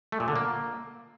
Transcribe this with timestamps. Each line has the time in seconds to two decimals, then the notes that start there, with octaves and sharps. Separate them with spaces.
0.12 A3
0.20 A#2
0.28 D3
0.36 A#3